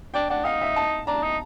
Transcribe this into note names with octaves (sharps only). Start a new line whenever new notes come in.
D4 G5
D4 F#5
D#4 F5
E5
A5
D4 A#5
D#4